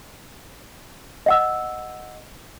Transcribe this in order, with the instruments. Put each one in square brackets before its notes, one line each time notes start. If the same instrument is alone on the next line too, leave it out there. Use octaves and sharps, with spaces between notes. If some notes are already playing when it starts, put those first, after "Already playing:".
[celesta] D#5 F#5 E6